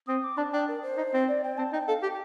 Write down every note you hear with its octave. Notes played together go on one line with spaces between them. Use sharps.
C4 D#6
D6
D4 A5
D4 G5
A#4
C5
D#4
C4
D5
G5
C4 A5
D#4 G5
A4 F5
G4 G5